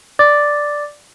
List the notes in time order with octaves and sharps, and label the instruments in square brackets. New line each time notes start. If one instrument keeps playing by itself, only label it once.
[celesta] D5 D6 A6